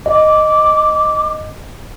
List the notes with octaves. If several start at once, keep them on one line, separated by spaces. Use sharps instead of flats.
D#5 D6